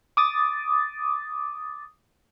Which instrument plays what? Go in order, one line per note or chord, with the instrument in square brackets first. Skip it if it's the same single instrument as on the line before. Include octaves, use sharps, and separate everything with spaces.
[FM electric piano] D6 D#6 A6